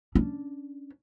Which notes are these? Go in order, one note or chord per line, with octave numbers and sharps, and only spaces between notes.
C#4 D4